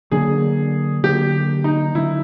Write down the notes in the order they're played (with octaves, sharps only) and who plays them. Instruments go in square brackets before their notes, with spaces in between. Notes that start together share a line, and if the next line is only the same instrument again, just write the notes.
[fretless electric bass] D3 F#3 A#3 D4 [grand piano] G#4
[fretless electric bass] D3 F#3 A#3 D4 [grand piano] G4
[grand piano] D#4
[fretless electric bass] D3 F#3 A#3 D4 [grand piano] E4